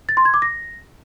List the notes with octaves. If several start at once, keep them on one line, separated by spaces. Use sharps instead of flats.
A6
C6
G#6
D6
A#6